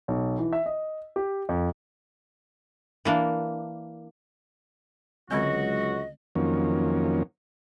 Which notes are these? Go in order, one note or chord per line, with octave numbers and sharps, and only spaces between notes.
B1
E3
E5
D#5
G4
F2
E3 A#3 D4
C#2 D3 F#3 G#3 C4 F#4 D#5
F2 D#3 F#3 A#3 C#4